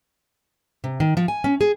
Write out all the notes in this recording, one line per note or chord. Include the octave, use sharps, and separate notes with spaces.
C3
D#3
F3
G#5
C#4
G#4